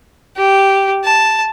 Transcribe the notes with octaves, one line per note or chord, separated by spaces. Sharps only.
G4
A5